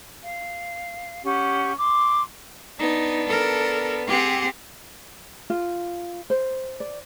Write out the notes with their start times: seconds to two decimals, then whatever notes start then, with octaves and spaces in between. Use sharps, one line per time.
0.23 F5
1.24 C#4 G4 F#5
1.77 C6 D6
2.79 B3 D4 D#4
3.27 A4 A#4
4.07 C4 G4 G#4 F#5
5.50 F4
6.30 C5
6.80 D5